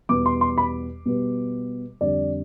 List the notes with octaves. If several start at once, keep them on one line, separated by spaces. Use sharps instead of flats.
E2 B2 G3 B3 D6
C6
C6
B5
B2 G3 B3
F2 D3 G3 D5